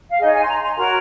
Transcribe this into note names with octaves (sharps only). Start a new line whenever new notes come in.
F5
D#4 G#4 C#5 D#5
G#5
C6
A#5
C6
F#4 A#4 C#5 A#5